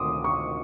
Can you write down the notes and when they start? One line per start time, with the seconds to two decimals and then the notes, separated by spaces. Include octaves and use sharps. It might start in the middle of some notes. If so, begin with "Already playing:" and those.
Already playing: D2 C3 D#3 C6 D6 D#6
0.24 C#6